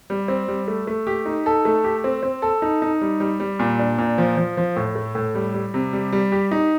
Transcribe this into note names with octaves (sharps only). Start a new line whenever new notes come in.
G3
C4
G3
A3
A3
G4
D#4
A4
A3
G4
C4
C4
A4
D#4
D#4
G3
G3
G3
A#2
D4
A#2
F3
F3
F3
A2
A3
A2
G3
G3
C3
G3
G3
G4
D#4